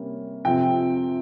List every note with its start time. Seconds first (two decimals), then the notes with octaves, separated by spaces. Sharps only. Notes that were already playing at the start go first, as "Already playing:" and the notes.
Already playing: C3 G3 A#3 C#4
0.45 F2 C3 F3 C4 G5